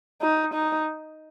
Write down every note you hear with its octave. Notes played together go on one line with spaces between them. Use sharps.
D#4
D#4